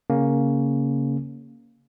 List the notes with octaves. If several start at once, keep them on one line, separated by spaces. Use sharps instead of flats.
C#3 A#3 C#4